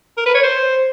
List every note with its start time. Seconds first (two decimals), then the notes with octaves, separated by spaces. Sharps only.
0.17 A#4
0.26 B4
0.34 C#5
0.43 C5